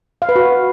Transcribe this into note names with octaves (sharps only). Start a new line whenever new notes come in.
F5
B4
F#4